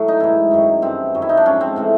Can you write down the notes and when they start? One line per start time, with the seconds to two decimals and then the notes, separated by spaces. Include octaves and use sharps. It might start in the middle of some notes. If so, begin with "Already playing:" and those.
Already playing: A2 F#3
0.08 D#4
0.20 G#2 E3 E4
0.51 F#2 D#3 F#3
0.82 G2 E3 C4
1.15 F#2 D#3 F#3
1.22 E4
1.29 D#4
1.37 D4
1.46 G#2 F3 C#4
1.61 C4
1.76 A2 E3 C4